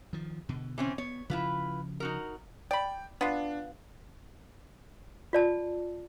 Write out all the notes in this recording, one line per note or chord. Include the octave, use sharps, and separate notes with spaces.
D#3 F3
B2 D3
E3 C4 C#4
B3 C#5
C#3 F3 E4 F4 B4
D#4 F#4 A#4
D5 G5 B5
B3 D4 F4
F4 D5 A5